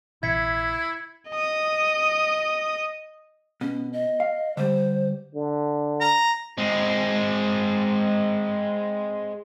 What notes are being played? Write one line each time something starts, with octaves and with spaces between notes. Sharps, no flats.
A#1 C3 E3 E4 E5 G#6 B6 C#7
D#5 D#6
B2 C#4
D#5
F5
D3 G3 C5
D3
A#5
G#3 C4